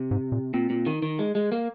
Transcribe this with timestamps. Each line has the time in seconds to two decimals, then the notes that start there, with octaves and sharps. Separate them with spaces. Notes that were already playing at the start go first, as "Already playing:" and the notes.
Already playing: C3
0.11 G#2
0.32 A#2
0.54 A#2 C4
0.70 A#2
0.86 D#3
1.02 D#3
1.19 G#3
1.35 G#3
1.52 A#3